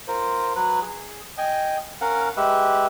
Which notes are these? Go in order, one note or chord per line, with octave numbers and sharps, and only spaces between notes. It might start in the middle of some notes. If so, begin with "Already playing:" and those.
F4 A#4 C5
F#3 B4
G#4
D#5 G5 G#5
C#4 A#4 F5 F#5
G#3 G4 B4 E5